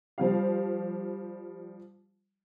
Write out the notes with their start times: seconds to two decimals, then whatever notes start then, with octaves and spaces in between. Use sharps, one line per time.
0.18 F3 G3 F5